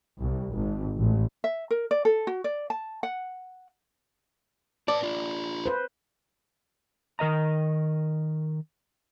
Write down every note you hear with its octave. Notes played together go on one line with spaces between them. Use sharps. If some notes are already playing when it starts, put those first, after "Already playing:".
C2
G#1
A1
E5
A#4
D5
A4
F#4
D5
A5
F#5
B4 D5 A5
D4 F4
B4 C5
D#3 A#4 D#5 A#5